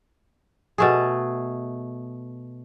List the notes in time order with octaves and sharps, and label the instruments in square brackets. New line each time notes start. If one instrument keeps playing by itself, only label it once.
[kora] B2 A3 G#4